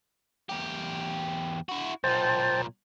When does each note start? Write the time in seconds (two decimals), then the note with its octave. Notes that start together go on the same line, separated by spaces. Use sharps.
0.49 E2 G4
1.69 E4 F#4
2.04 B1 A#2 C5 G5 A5